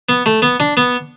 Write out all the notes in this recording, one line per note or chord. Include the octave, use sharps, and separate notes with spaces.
B3
A3
B3
D4
B3